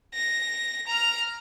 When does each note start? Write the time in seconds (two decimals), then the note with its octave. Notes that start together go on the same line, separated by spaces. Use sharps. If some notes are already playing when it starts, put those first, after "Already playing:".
0.14 A#6
0.87 A#5 F6